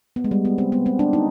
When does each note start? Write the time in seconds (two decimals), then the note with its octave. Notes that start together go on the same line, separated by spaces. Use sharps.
0.16 B3
0.24 G#3
0.31 G3
0.45 B3
0.58 C4
0.72 B3
0.86 C4
0.99 D4
1.13 D#4